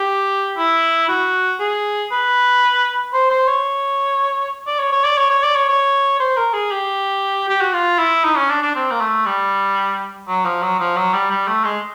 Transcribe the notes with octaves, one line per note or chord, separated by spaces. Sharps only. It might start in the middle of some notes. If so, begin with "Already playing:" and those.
Already playing: G4
E4
F#4
G#4
B4
C5
C5
C#5
D5
C#5
C#5
D5
C#5
C#5
D5
C#5
C#5
C5
A#4
G#4
G4
G4
F#4
F4
E4
D#4
C#4
D4
D4
C4
A#3
A3
G3
F#3
F3
F#3
F3
F#3
G3
G3
A3
G#3